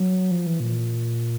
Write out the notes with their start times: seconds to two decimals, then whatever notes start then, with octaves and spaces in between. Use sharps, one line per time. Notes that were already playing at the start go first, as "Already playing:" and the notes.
Already playing: F#3
0.31 F3
0.46 E3
0.60 A#2